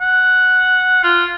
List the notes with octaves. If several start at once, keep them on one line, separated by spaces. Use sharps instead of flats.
F#5
F4